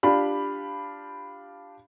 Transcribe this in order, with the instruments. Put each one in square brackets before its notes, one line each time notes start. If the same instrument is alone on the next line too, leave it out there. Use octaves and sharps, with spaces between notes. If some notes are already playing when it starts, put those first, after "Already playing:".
[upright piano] D4 F4 G4 B5